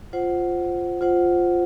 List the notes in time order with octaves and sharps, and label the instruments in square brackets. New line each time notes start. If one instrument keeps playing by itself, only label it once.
[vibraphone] F4 C5 F#5
F4 C5 F#5